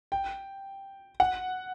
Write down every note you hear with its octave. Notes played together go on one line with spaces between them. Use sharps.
G5
F#5